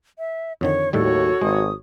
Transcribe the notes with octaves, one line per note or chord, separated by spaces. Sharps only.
E5
F2 D3 D#3 C#5
D#2 A2 D#3 G3 F#4 A4 C#5
G#1 G#3 D#6